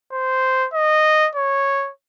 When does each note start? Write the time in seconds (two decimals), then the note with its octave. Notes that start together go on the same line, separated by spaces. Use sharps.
0.12 C5
0.73 D#5
1.35 C#5